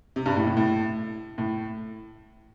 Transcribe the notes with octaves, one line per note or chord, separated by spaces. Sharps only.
C3
G2
A2
A2
A2
A2